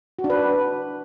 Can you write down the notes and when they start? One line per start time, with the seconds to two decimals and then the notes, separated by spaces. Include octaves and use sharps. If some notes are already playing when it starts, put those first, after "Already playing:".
0.19 F#4
0.24 D4
0.30 B4